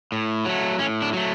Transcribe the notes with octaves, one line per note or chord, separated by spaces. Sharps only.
A2
F#3 A3
A2 C#4
D4
F#3 A3